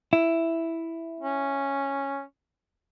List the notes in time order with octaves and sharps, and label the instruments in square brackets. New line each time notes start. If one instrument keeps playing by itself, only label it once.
[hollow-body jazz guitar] E4
[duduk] C#4